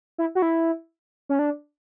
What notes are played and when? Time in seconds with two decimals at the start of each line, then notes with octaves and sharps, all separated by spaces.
0.18 E4
0.35 F#4
0.42 E4
1.29 C#4
1.39 D4